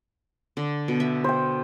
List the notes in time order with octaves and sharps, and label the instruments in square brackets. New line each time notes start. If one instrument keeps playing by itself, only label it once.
[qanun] D3
B2
E5
[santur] C5 G5